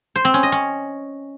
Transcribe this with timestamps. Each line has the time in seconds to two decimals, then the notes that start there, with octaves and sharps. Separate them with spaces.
0.16 C5
0.25 C4
0.34 C#4
0.43 D#5
0.52 C#4